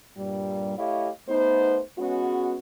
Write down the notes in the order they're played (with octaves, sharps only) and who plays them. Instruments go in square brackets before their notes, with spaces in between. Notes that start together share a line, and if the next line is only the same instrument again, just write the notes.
[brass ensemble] G2 A#2 G3
A3 E4 G4 C#5 D#5 F5
A3 B3 D#4 C5
G#3 B3 C#4 F#4